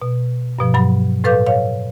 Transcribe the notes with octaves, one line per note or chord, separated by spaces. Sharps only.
B2
G2 B2 F3
G2 F#3 B5
A2 A4 B4 F5 D6 G6
C#5 F5